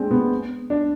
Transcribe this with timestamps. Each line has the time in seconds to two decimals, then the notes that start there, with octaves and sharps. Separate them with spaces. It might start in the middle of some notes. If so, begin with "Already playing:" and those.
Already playing: G#3 C4 D4
0.11 B3
0.70 D4